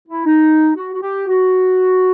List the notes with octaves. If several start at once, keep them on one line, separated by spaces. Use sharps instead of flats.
E4
D#4
F#4
F#4
G4
F#4